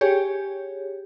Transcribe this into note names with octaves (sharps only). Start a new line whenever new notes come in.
G4 G#4 C#5